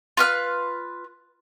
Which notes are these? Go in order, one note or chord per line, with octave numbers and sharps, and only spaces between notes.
F4 B4 F6